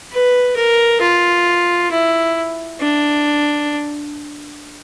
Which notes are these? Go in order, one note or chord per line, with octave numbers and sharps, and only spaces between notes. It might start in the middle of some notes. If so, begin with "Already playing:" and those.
B4
A#4
F4
E4
D4